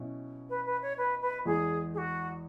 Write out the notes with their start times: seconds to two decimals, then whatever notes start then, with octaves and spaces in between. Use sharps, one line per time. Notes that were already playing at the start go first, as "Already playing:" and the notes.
Already playing: B2 F#3 C#4 E4
0.49 B4
0.66 B4
0.82 C#5
0.98 B4
1.22 B4
1.45 E2 E3 G#3 G#4
1.94 G#4
1.98 F#4